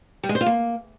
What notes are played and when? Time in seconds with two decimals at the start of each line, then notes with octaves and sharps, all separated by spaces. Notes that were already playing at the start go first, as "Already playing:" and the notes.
0.24 G3
0.29 G#3
0.35 C5
0.41 F4
0.46 A#3